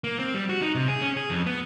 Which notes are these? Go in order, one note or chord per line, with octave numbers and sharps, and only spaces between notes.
A#3
C4
G3
F#4
D#4
C3
G#4
C#4
G#4
F2
B3